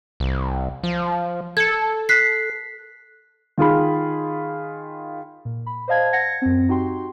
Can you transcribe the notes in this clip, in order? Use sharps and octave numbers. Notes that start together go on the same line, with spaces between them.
C2
F3
A4 G#6 C#7
F#6 B6 C7
D#3 F4 G#4 B5
A#2
B5
C5 D5 D#5 F5 A5 G#6
F#5 G#6 A#6 C#7
F#2 C4
D#4 F#4 G4 G5 C6